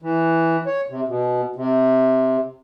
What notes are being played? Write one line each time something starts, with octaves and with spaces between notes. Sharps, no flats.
E3
C#5
C3
B2
C3